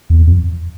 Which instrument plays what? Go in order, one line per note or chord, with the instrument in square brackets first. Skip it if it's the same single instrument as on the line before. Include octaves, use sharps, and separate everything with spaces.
[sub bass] E2
F2